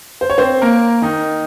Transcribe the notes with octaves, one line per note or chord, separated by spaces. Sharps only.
C5
C#5
C4 C5
A#3 A#4
D#3 D#4